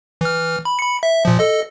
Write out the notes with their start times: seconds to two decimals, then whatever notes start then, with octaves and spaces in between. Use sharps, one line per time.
0.21 E3 F6
0.65 B5
0.79 B5 C#7
1.03 E5
1.25 A#2 F3
1.39 A4 D#5